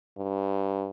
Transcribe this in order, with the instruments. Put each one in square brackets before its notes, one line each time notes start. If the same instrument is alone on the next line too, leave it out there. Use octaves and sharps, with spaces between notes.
[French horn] G2